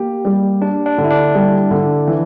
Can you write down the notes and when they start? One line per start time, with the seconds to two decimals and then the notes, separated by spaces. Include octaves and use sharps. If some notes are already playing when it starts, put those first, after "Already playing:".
Already playing: A#3 G4
0.25 G3
0.61 D4 G4
0.86 D4
0.98 D3
1.04 E4
1.10 D4
1.35 G3
1.71 D3
2.07 E3